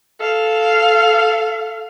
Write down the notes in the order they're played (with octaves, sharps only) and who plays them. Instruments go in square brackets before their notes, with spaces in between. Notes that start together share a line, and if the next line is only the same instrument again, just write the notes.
[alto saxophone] A4 [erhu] F5